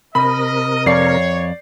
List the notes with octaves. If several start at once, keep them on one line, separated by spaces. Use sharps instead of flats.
C3 A#4 D#5 B5
F2 C#5 D5 C7